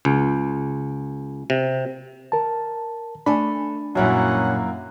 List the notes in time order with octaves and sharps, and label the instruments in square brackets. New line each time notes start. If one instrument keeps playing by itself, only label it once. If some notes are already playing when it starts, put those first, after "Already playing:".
[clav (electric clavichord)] C#2
C3
[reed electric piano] A#4 A5
[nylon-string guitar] A3 G#5 [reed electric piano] D4 B5
[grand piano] F#2 A#3 E4 [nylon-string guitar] A#2 G3 F#4 [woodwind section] C#4 F#5